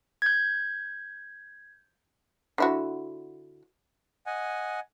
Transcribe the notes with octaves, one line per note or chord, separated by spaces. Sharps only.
G6 G#6
D3 E4 F#4
D#5 F#5 G#5